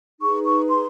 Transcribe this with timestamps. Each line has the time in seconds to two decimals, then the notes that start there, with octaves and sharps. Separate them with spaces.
0.21 D#4 G#4 B4 C#6
0.45 C#6
0.68 C6